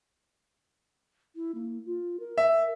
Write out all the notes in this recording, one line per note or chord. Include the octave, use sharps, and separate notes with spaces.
E4
A#3
F4
A#4
E5